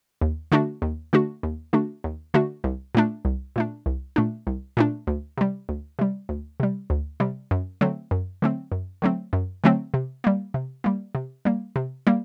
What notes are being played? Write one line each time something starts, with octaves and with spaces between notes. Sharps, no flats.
D#2
D3 A3 D4 F#4
D#2
D3 A3 D4 F#4
D#2
D3 A3 D4 F#4
D#2
D3 A3 D4 F#4
C2
A#2 A3 D4
C2
A#2 A3 D4
C2
A#2 A3 D4
C2
A#2 A3 D4
D2
C3 G3
D2
C3 G3
D2
C3 G3
D2
C3 G3
F#2
D3 F#3 A3 C4
F#2
D3 F#3 A3 C4
F#2
D3 F#3 A3 C4
F#2
D3 F#3 A3 C4
C3
G3 A#3
C3
G3 A#3
C3
G3 A#3
C3
G3 A#3